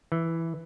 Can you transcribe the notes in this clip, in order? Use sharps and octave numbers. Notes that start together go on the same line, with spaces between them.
E3